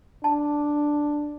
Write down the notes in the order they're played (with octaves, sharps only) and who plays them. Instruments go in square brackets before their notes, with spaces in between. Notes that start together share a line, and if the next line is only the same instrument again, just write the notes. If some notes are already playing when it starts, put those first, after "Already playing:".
[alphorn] D4 [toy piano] A5